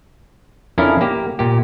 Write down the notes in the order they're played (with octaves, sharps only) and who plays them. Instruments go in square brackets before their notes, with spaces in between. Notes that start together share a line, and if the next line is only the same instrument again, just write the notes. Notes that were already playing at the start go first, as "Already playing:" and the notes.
[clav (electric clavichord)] F2 C#4 D4 E4 A#4 F5
A#3 G4
A#2 G4